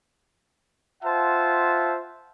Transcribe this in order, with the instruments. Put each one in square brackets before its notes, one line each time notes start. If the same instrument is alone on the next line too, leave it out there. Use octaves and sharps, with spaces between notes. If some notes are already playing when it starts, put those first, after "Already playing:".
[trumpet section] F4 C5 E5 F#5 A5